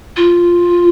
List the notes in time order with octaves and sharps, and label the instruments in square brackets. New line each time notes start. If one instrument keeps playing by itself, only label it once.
[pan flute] F4